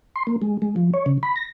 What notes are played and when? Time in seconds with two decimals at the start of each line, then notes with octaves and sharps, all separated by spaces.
0.16 C6
0.27 A#3
0.42 G#3
0.62 G#3
0.76 F3
0.94 C#5
1.06 C#3
1.23 B5
1.36 A#6